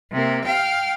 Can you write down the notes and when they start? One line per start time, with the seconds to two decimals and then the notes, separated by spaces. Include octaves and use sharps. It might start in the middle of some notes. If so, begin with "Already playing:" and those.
0.12 C3 A#3
0.44 F5 G5